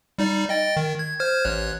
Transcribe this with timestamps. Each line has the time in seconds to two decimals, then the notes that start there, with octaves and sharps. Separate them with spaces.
0.18 G3 D#4 D5
0.49 D#5 G5 A6
0.77 D#3
0.99 G#6
1.20 C5 F6 G#6
1.45 A1 C#5 F#6